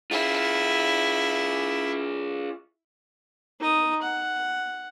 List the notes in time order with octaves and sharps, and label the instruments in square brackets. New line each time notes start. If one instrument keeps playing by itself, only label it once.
[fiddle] E4 [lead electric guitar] F4 G#4
[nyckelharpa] D#4 D#6
F#5